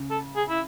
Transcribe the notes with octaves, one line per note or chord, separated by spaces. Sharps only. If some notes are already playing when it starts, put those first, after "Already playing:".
Already playing: C#3
A4
G#4
E4